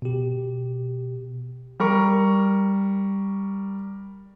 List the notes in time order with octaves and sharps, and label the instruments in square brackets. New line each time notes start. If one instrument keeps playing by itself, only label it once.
[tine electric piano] B2 G4
[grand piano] G3 A#4 C#6